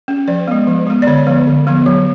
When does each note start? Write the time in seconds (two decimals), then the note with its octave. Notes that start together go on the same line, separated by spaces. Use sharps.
0.08 C#4
0.28 F3 D5
0.48 G#3 B3
0.67 F3
0.87 G#3 B3
1.02 D5
1.07 D3 C#5
1.27 F3 B3
1.47 D3
1.67 F3 B3
1.86 F#3